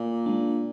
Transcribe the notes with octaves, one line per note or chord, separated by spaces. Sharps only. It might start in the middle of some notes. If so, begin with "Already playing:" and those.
Already playing: A#2
G#3 D4